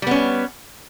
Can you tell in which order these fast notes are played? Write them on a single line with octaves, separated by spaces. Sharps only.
G3 B3 C#4